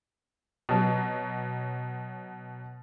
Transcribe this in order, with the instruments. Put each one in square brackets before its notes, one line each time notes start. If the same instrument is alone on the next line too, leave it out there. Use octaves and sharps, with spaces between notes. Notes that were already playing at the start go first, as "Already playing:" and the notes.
[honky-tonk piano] B2 F#3